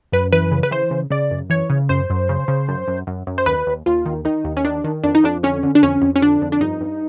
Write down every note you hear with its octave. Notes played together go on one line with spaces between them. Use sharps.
F#2 B4
E3 B4
C#3
B4
E3 C5
C#3
C#3 D5
F#2
E3 C#5
C#3
F#2 C5
F#2
C#3
C#3
F#2
F#2
F#2
F#2
C5
D#2 B4
D#2
D#2 F4
D#3
D#3 D#4
D#2
C#4
D#3 D4
D#3
F2 D4
D#4
F2 D4
D3 C#4
D3
D4
F2 C#4
F2
C#4
D3 D4
F2
D4
G2 D#4
G2